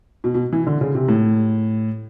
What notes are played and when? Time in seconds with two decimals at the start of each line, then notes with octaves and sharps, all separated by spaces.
0.24 B2
0.34 B2
0.53 E3
0.67 D3
0.81 C#3
0.95 C3
1.08 A2